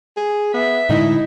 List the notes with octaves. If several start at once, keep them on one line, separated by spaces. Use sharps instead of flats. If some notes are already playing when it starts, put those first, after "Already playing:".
G#4
B3 E5
A2 D3 G#3 D#4 E4